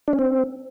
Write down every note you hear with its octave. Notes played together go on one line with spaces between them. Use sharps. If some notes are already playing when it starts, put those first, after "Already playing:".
D4
C#4
C4